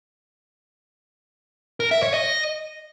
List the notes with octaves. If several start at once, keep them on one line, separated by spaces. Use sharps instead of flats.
A#4
E5
C#5
D#5